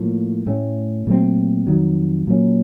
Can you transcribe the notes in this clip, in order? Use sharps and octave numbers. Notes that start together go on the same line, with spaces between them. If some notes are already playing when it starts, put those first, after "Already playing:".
Already playing: A2 F3 A#3
A2 A3 C#4
A#2 F#3 A3 C4
F2 D#3 F#3
A#2 F#3 A#3 C#4